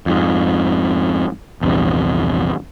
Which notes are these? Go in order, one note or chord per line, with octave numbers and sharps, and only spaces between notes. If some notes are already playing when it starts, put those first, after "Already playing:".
F2 G#2
A#1 E2 G2 C3